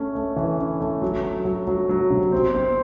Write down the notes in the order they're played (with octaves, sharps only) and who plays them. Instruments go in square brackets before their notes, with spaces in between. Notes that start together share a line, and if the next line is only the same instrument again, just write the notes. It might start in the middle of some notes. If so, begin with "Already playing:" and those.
Already playing: [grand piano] A3 C#4
A3
E3
C#4
A3
F#3
F#3
F#3
F#3
F#3
C3
C4
C4